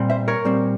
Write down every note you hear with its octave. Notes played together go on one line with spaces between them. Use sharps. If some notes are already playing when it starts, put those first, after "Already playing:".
Already playing: A#2 G3 C4
C5 E5
A#4 C#5
A#2 G3 C4